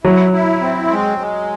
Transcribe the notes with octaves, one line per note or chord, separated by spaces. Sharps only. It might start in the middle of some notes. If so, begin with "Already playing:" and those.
F#3 E4
E4
C4
G#3
G#3